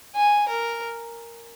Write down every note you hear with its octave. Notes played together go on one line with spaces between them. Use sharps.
G#5
A#4